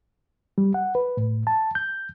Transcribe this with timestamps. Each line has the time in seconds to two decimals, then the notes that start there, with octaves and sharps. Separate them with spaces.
0.58 G3
0.74 F#5
0.95 B4
1.17 A2
1.47 A5
1.75 G6